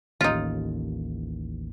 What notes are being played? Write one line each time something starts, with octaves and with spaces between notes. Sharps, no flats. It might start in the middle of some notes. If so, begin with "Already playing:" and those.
A1 D#2 D#4 F4